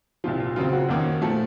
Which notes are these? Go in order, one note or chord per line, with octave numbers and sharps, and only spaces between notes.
C2 A#2 F3 F4
F4
F#2 C#3 F#3 C4 F4
F#4
F2 D#3 A#3 C#4
A#2 F3 A3 A4